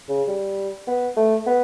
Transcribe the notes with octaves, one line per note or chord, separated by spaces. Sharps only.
C#3
G3
B3
A3
B3